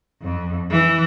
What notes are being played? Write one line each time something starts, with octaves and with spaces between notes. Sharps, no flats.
F2
E3